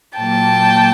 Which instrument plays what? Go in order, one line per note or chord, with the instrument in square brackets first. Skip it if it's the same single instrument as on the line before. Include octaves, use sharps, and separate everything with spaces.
[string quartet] A#2 F#3 A#3 G5 A5